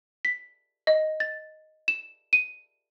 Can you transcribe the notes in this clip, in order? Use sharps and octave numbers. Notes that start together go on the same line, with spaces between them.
B6
D#5
A6
E7
D#7